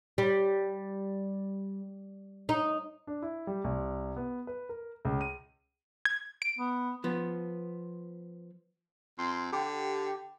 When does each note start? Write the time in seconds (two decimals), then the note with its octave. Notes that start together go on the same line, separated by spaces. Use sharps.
0.18 G3
2.49 D#4
3.07 D4
3.22 E4
3.47 G3
3.64 C2
4.17 B3
4.47 B4
4.69 A#4
5.05 C#2
5.21 D#7
6.05 G#6
6.42 D7
6.59 B3
7.04 F3 B3
9.18 F2 C6
9.52 D3 G4